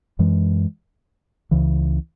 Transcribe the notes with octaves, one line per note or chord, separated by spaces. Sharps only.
F#2 E3 G#3
C#2 C#3 E3